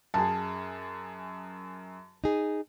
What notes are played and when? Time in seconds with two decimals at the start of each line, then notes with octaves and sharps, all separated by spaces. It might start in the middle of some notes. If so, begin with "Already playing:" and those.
0.14 F#2 G#4 A5
2.24 D#4 G#4